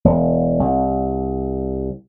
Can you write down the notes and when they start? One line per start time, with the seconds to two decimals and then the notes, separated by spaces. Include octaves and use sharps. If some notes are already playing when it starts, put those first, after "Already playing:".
0.05 E1
0.59 C2